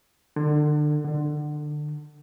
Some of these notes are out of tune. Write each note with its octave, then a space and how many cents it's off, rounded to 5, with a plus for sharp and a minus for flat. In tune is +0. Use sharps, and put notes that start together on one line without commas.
D3 +30
D3 +25